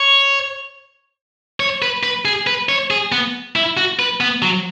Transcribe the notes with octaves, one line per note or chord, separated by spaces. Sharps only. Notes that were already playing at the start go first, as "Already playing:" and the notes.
Already playing: C#5
C#5
B4
B4
G#4
B4
C#5
G#4
B3
E4
F#4
B4
B3
F#3